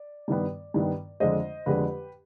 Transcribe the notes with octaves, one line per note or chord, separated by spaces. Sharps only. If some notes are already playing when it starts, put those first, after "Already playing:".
Already playing: D5
G2 D#3 G3 B3
G2 D#3 G3 B3
F2 D3 G#3 D4 C5 D#5
F2 D3 G#3 D4 G4 B4